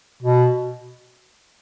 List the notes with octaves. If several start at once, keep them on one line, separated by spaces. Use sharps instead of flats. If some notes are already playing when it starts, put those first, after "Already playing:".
B2